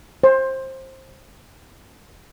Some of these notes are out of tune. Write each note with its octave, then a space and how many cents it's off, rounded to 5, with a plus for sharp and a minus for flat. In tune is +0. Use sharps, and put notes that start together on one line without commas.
C5 +20